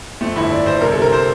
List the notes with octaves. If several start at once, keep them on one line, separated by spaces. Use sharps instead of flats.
F2 A3
G1 E4
G1 D5
G1 C5
C2 A#4
A4
C3 A#4
C5